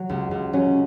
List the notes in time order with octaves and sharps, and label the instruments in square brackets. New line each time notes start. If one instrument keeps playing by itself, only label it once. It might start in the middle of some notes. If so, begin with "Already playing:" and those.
Already playing: [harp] F#3
C#2
C#2
[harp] F#3 [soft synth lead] C#4